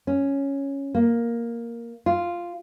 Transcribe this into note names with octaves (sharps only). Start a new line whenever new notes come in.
C#4
A#3
F4